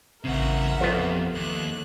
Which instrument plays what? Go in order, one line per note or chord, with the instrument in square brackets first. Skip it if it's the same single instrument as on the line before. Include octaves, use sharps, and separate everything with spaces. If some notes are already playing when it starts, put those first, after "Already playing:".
[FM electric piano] A1 C4 [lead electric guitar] E2 C#3 [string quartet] A#4 E5 F#5
[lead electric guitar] F2 [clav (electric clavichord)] B3 F4 C5 [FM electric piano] G4 A4
[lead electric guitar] D#2 [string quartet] F#6